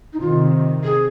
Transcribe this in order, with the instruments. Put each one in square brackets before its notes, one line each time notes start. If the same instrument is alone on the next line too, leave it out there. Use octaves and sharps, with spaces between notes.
[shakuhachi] D#4
[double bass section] C3 D#3 [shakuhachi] F4
[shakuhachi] G#4